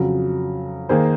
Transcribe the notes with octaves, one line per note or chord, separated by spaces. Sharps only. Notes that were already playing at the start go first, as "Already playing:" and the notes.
Already playing: F2 C#3 F#3
D#3 A#3 D#4 G#4 C5